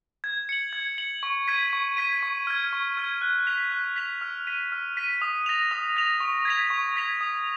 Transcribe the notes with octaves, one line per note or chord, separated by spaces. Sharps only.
G#6
C#7 F#7
G#6
C#7 F#7
C#6
G#6 B6 D#7
C#6
G#6 B6 D#7
C#6
F6 G#6
C#6
F6 G#6
F#6
B6 F7
F#6
B6 F7
F6
B6 D#7
F6
B6 D#7
D#6
A#6 F7
D#6
A#6 F7
C#6
G#6 B6 F7
C#6
G#6 B6 F7
D#6